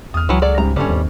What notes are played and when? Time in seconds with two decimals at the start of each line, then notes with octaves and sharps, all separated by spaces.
0.14 E2 D#6 F6
0.29 C#2 E3 F#3
0.42 F#3 G#4 A4 D5
0.58 G#2 C#3 G3 A#5
0.76 G1 G3 C#4 A4 G#5
0.89 G#1 D#2